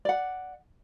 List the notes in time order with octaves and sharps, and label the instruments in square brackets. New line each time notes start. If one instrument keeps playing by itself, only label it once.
[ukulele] D5 F#5